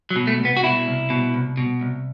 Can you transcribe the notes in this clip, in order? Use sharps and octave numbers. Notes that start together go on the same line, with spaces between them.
F#3
B2
A3
C2
B3
F#4
B2 E4
C2
B2
C2
B2
C2